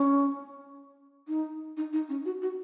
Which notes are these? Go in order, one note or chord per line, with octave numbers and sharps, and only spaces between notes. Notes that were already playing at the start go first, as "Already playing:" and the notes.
Already playing: C#4
D#4
D#4
D#4
C#4
F#4
F#4